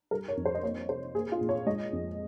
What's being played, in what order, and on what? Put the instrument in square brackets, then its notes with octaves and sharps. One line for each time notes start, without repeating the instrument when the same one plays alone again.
[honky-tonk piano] G3 A#4
C#5
F2
C5
D#5
A#3 C#5
C3 C5
A#3 G#4
F4
A#2
C#5
G#3 D#5
F2